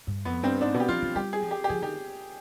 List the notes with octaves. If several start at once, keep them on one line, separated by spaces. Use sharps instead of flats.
G2
F2 B3
G2 C4
G#2 D4
B2
G4
F3 F4
F3
G3 G4
G#4
F3
G4
G4
F3 G#4
D#3 G4